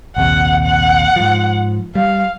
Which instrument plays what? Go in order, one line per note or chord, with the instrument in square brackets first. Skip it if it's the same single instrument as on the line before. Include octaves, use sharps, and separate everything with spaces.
[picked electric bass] A#1 D#2 C3 [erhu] F#5
[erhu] F#5
[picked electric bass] G#2 F3
[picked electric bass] G3 [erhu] F5